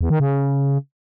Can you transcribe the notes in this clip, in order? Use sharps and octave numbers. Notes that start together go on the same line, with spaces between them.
E2
D#3
C#3